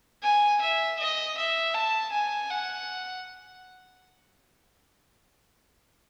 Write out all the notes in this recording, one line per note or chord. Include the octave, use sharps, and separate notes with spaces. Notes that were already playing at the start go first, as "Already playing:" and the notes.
G#5
E5
D#5
E5
A5
G#5
F#5